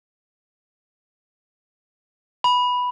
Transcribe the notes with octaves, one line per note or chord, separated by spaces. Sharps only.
B5